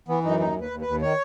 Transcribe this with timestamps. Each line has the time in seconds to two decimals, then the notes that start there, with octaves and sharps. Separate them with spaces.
0.08 E3 B3
0.23 F#2 D#4
0.40 D#2 D#4
0.55 D#2
0.61 B4
0.70 D#2
0.81 B4
0.87 D#2
1.02 D#3 C#5